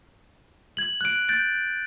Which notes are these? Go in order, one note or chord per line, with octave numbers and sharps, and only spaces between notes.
G#6 F#7
F#6 D7
G6 A6 D7